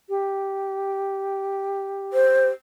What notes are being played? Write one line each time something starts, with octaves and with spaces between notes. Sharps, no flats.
G4
C5